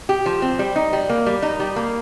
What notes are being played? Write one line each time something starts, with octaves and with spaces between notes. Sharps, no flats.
G4
F3
C4
G3
D#4
G3
A#3
G3
D#4
G3
A#3